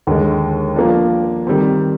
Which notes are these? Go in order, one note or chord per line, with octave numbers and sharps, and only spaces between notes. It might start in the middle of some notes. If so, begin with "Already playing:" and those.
D#2 D3 G#3
F3 A#3 D4
D#3 G3 C4